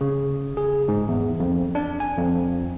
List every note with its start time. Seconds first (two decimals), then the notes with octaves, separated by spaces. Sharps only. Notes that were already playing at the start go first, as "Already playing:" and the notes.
0.01 C#3
0.57 G#4
0.88 G#2
1.08 E2
1.40 F2
1.75 D4
2.00 G#5
2.18 F2